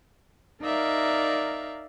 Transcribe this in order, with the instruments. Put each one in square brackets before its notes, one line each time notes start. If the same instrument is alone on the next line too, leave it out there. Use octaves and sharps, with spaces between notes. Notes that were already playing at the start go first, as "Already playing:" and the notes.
[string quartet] D#4 A#4 D5 E5 F5